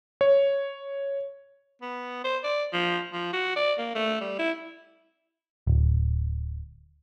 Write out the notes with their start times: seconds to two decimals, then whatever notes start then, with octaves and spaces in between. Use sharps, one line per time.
0.21 C#5
1.82 B3
2.24 C5
2.44 D5
2.73 F3
3.13 F3
3.33 F#4
3.56 D5
3.78 A#3
3.95 A3
4.21 G3
4.39 E4
5.67 D1